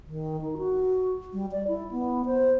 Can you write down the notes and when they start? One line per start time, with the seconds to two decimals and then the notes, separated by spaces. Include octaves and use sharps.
0.06 D#3
0.41 D#4
0.58 F#4
1.33 G3
1.51 D5
1.67 E4
1.91 B3
2.26 C5